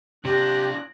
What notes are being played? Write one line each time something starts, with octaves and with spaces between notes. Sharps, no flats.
C3 D4 F4 G4 F#6 A#6